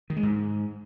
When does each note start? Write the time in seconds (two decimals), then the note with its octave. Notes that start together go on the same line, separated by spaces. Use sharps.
0.10 D#3
0.16 G#3
0.23 G#2